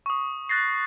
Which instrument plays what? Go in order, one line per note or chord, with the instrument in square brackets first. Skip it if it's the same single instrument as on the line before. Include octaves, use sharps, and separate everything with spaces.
[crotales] C#6 D#6
F#6 A6 A#6 C7